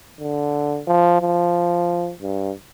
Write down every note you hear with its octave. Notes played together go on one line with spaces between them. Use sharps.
D3
F3
F3
G2